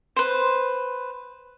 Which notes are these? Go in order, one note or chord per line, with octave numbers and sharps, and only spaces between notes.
B4 C5